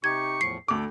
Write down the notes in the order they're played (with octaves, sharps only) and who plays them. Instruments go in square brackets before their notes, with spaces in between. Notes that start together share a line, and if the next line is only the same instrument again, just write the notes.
[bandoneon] C3 D#4 G4 [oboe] C#6 [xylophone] G#6
[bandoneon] E2 A2 F3 [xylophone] C7
[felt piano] D2 D6 [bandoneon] A4